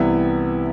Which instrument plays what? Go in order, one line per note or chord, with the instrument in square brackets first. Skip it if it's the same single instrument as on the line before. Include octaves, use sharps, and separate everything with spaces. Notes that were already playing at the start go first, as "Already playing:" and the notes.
Already playing: [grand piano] C2 C3 E3 B3 E4 E5